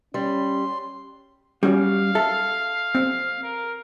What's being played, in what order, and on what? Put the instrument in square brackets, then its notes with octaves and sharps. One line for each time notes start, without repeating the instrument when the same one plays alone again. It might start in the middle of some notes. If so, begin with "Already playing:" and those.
[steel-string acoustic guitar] G3 [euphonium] C#4 [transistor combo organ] C6
[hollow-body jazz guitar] G3 [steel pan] C#4 F#4 [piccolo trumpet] F5
[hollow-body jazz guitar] A4 [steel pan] E5
[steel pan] C4
[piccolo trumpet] A#4